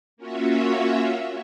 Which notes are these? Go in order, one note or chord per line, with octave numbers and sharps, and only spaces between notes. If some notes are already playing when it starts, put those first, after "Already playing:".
A#3 C#4 F4 F#4 C#5 E5